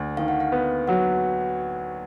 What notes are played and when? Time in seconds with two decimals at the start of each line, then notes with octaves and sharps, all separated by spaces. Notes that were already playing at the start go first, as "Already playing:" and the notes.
Already playing: D2
0.17 D#3 F5
0.28 F#5
0.40 F5
0.52 B3
0.87 F#3 F#5